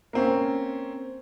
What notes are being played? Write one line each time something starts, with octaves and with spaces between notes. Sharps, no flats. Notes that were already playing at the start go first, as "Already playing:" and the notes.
A#3 C4 C#4